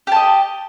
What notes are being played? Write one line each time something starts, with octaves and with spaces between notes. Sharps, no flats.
G4 D#5 A5